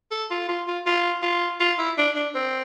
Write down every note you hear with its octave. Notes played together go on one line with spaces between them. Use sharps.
A4
F4
F4
F4
F4
F4
F4
E4
D4
D4
C4